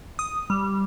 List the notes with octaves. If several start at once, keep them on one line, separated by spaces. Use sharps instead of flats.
D#6
G3